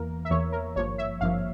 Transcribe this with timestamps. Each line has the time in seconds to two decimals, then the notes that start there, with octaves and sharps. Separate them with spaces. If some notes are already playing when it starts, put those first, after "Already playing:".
Already playing: E2 E3 A#3 A#4
0.25 E5
0.30 E2 E3 A#3 C#5
0.52 A#4
0.76 G#1 G2 F3 A#3 C#5
0.98 E5
1.21 G#1 G2 F3 A#3 F5